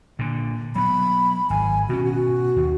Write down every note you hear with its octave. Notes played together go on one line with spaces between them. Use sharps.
A#2 D3
F#3 B3 B5
G#1 G#5
B2 C#4 F#4
F#4
D#2